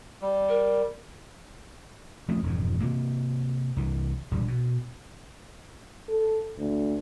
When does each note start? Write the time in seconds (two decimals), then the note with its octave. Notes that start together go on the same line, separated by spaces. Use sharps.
0.21 G3
0.49 A#4
2.28 F3 A3 C4 C#4
2.43 E1 F2 G#2 F3
2.81 C3 A#3
3.77 C2 E3
4.31 E1 A#1 E2 G3
4.48 B2
6.09 A4
6.58 D2